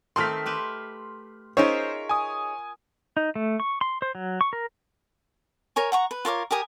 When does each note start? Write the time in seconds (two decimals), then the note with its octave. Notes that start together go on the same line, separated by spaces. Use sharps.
0.16 D#3 A3 C4 C6 F6 B6
0.46 G4 B4 E5
1.57 C#4 D#4 F4 G#4 A#4 C5 C#5 E5
2.09 G#5 D#6
3.17 D#4
3.35 A3
3.60 C#6
3.81 C6
4.02 C5
4.15 F#3
4.41 C#6
4.53 A#4
5.76 A#4 C#5 G#5
5.92 F#5 A#5 C#6
6.11 B4
6.25 F4 A#4 C#5 D6
6.51 G4 A#4 G#5 D#6